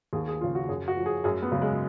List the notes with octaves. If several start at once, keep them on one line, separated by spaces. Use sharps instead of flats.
D#2 G#4
G#4
C#3 F3 F4
F#4
F#2 G#4
F#4
F3
G#4
F#2 G#4
B3
C#3 F#3
G#3